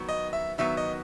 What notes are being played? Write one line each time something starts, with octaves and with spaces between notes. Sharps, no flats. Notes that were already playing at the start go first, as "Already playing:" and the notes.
Already playing: D#3 F#3 B3
D#5
E5
D#3 F#3 B3 E5
D#5